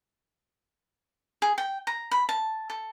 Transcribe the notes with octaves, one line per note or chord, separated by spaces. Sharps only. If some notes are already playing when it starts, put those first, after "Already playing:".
G#4
G5
A#5
B5
A5
A4